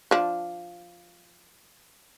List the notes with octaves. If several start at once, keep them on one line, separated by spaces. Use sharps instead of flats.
F3 D4